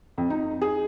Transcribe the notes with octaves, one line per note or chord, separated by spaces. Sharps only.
F2
D#4
G#4